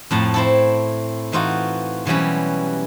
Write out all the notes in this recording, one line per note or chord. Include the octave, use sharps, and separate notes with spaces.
F2 A2 A5 A#5
C4 E4 A4
E3 D#4 F4 F#4
B2 E3 F#3 G3 C#4